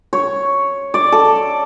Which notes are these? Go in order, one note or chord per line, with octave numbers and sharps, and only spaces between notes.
C#5
D5
A4